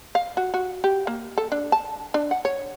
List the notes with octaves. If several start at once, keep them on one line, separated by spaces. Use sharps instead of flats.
F5
F#4
F#4
G4
A#3
A4
D4
A5
D4
F#5
C#5